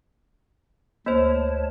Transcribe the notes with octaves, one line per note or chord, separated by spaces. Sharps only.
D2 A#3 C5 C#5 A5